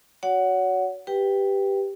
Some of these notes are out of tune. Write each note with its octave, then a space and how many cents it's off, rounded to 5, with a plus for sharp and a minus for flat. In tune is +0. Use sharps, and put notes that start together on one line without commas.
F#4 +0 C#5 +35 F#5 +0
G4 +0 B4 +0 G5 +0